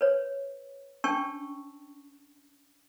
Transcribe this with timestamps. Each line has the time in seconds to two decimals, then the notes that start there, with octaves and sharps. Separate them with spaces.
0.01 B4 C#5
1.04 C#4 D4 G5 A5 C#6 E6